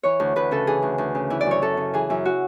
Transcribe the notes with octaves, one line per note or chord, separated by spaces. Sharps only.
E3 C#5
D2
D2 B4
C#3 A4
E3 G#4
D2
D2
C#3
E3 E4
D5
F#2 C#5
F#2 A4
C#3
E3 G#4
F#2 E4
F#4